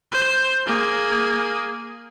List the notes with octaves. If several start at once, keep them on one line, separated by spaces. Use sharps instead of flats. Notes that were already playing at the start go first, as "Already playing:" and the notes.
C5
A#3 G#4